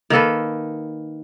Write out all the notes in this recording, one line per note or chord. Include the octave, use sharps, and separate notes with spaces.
D#3 A#3 A4 B4